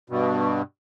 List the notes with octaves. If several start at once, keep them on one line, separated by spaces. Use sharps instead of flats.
G2 B2